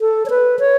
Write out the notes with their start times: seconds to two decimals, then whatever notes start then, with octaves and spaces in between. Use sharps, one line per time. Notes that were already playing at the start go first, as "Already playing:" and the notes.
0.01 A4
0.26 C#5
0.30 B4
0.59 C#5